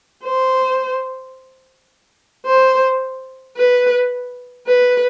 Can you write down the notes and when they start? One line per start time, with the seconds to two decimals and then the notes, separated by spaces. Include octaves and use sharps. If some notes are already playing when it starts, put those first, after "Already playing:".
0.24 C5
2.46 C5
3.57 B4
4.67 B4